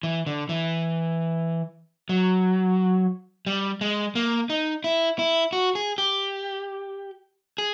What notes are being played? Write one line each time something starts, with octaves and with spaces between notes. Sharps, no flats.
E3
D3
E3
F#3
G3
G#3
A#3
D#4
E4
E4
F#4
G#4
G4
G#4